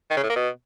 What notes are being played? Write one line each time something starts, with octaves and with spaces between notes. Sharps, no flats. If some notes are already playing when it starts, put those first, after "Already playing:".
D#3
C#3
A2
A#3
B2